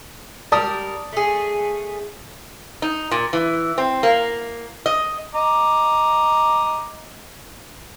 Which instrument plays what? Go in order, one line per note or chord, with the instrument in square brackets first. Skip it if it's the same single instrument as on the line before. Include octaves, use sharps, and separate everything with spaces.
[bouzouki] G3 A#4 [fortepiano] D5 A5 D#6
[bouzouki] A3 G#4
[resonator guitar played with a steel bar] D#4
A#2
E3
C4
A#3
D#5
[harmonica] D#5 A#5 D6